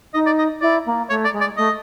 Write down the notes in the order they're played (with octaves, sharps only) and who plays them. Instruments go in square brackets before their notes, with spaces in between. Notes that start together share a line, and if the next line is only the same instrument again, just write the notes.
[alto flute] D#4 [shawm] D#5
[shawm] D5
D#5
[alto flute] E4 [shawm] D5
[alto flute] A#3
[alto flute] A3 [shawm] C#5
[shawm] D5
[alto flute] G#3
[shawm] D5
[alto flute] A3 [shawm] D#5